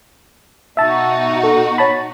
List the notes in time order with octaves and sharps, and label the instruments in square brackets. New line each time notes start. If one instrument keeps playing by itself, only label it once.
[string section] B2 D#4 F#4 [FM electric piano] E5 A5
[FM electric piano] A4
C#5 A5 B5